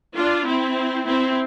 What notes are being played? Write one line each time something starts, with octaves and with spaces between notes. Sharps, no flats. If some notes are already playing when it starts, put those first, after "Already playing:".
D4 F4
C4 E4
C4 E4